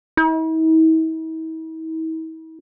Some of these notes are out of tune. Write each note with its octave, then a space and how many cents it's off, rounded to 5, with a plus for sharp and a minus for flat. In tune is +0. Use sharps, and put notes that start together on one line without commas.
E4 -45